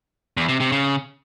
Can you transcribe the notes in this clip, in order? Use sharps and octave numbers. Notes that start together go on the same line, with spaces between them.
E2
C3
C3
C#3